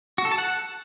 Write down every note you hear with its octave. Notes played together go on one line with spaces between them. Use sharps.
F#4
A4
A5
F#5